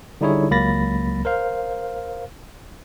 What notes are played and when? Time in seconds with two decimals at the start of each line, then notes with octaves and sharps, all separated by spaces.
0.21 D3 G3 D#4 E4 G#4 C#5
0.51 C#2 F#3 A#3 B5 A6 A#6
1.25 A#4 C5 F5